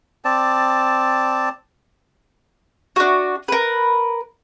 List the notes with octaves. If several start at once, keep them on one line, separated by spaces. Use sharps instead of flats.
C4 D5 A5
D4 F#4
A#4 B4